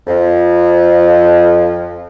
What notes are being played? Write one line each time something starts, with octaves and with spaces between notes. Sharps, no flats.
F2 F3